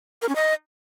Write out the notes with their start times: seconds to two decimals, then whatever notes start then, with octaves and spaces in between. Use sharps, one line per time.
0.22 A#4
0.29 C#4
0.36 D#5